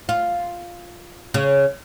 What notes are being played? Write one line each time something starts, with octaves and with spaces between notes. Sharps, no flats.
F4
C#3